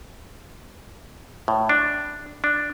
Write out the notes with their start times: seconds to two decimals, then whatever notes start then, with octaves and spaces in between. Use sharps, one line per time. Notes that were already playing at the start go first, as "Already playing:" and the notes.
1.48 A2
1.69 D4
2.44 D4